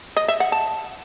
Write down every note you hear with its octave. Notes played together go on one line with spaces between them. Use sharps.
D#5
E5
F#5
A5